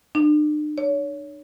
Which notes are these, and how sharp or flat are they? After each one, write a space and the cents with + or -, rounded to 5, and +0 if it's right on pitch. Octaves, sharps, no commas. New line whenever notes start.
D4 +45
C#5 +25